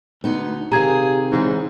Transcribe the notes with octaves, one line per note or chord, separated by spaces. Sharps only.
D2 B3 D#4
C3 D#3 G4 G#4 F5 A#5 G#6
G#2 C#3 E3 C4